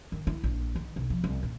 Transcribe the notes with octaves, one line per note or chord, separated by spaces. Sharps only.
D#3
E4
A#1
D#3
B1
F3
C2
A#2